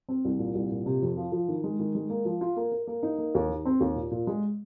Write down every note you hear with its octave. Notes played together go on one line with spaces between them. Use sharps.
C4
C2
A#2
C2
A#2
C3
F2
F3
F3
D#3
G#3
D#3
G#3
A#3
F3
F4
A#3
A#4
A#3
D#4
A#3
D#2
D#3
C4
D#2
A#2
A#2
G#3